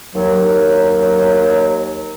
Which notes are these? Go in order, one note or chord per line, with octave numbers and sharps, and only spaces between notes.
D#2 F#3